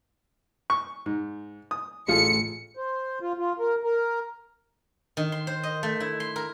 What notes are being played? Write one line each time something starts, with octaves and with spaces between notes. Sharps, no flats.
C#6
G#2
D#6
A1 A3 F4 G#4 C#7
C5
F4
F4
A#4
A#4
D#3
C6
C5
D#5
A3
E4
C6
A#4